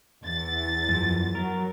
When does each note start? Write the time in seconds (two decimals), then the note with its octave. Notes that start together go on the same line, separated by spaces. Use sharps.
0.24 E2 A6
0.89 F#2 F3
1.35 F#3 A#4